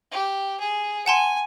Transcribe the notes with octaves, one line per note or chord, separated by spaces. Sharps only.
G4
G#4
F#5 G#5 A5 C6